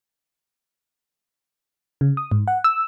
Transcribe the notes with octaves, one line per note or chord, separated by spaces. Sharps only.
C#3
D#6
G#2
F#5
E6